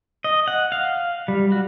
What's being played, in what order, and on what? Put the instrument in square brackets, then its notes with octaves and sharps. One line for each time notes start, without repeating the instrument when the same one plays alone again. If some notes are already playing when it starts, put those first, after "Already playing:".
[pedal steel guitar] D#5
F#5
F5
G3
F#4